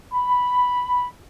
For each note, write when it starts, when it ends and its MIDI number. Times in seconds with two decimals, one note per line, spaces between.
0.14 1.07 83